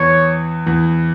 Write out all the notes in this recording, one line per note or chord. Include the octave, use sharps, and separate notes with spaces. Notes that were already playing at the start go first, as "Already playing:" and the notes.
Already playing: E2 E3 C#5
E2 E3